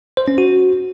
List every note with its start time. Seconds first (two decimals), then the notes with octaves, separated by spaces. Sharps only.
0.17 C5
0.28 C#4
0.38 F#4